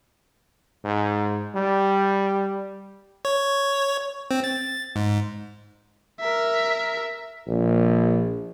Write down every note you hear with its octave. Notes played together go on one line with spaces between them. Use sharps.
G#2
G3
C#5
C4
A6
G#2
A#4 E5
A#1